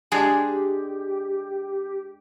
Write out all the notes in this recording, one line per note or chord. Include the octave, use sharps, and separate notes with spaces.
G#3 D4 G4 G#4 G#5